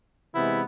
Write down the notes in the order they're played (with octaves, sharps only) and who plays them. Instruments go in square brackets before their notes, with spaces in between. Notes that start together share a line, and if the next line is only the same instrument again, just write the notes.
[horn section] C3 E3 G#3 B3 E4